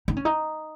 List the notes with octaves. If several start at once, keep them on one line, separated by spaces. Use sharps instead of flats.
D#4
C#4
D#4